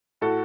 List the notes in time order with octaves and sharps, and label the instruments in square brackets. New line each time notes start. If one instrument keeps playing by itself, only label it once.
[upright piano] A2 F#4 A4